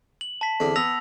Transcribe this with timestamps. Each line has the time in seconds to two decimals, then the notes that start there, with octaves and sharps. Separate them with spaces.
0.21 F#7
0.41 A5 B6
0.60 E2 D3 C4
0.76 B3 E6 A#6 F7